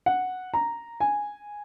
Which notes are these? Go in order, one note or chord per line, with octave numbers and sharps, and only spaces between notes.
F#5
A#5
G#5